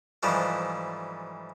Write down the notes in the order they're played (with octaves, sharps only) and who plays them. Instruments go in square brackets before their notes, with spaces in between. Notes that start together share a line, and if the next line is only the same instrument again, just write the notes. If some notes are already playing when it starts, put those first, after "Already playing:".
[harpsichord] G#2 E3 F3 G3 A3